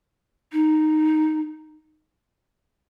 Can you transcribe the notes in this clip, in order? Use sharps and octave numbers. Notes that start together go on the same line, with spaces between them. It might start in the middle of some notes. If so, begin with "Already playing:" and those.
D#4